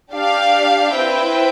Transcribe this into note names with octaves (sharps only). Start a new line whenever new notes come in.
D4 G4 D5 F5
C4 E4 B4 E5 G5